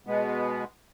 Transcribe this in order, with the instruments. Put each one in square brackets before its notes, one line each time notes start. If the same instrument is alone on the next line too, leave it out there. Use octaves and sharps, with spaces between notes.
[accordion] B2 G#3 B3